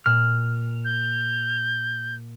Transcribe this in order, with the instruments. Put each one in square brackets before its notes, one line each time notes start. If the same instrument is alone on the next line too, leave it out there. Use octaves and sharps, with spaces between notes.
[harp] A#2 [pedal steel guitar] F6
[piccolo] G6